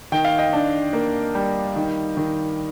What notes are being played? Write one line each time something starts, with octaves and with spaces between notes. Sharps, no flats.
D#3 G5
F5
D#5 G5
D4
A#3
G3
D#3
D#3